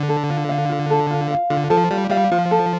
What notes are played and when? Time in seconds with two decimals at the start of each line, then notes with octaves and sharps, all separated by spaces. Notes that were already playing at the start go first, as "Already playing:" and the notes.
Already playing: D3
0.08 A4
0.29 F4
0.49 F5
0.69 F4
0.90 A4
1.10 F4
1.31 F5
1.50 D3 F4
1.70 F3 A4
1.91 G3 F4
2.10 G3 F5
2.31 F3 F4
2.51 A4